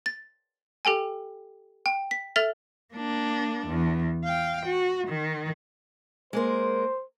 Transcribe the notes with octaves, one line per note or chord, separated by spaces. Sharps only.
A6
G4 A4 G5 G#5
G5
B6
A4 E5 F6 A6 F7
A#3 D4
E2
F5 G5
F#4
D#3
G#3 A#3 A#4 C5